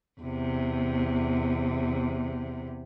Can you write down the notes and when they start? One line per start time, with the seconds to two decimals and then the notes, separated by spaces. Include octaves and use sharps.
0.21 E2 C3